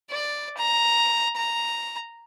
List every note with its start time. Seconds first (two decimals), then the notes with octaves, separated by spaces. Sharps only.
0.11 D5
0.57 A#5
1.36 A#5